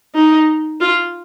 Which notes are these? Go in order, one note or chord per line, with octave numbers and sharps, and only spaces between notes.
D#4
F4